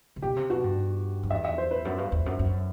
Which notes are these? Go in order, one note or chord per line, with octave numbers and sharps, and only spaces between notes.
C3
B2 G4
C3
B2 F#4
G2
F#2
E2 E5
E5
C5
B4
F#2
G2
E2
F#2
F#2